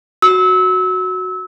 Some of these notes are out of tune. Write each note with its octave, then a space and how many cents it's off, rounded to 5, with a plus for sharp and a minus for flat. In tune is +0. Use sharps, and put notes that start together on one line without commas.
F#4 +0 E6 -25